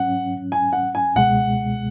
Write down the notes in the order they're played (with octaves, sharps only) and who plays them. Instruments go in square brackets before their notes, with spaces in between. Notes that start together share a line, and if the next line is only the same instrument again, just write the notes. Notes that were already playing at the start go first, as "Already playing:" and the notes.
Already playing: [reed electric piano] G#2 F#3 C#4 [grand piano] F#5
[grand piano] G#5
F#5
G#5
[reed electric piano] C#2 B2 G#3 [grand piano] F#5